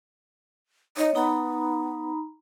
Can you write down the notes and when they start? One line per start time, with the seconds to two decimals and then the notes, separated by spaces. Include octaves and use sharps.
0.97 D#4 C#5 D#5
1.15 B3 D#4 A#5 B5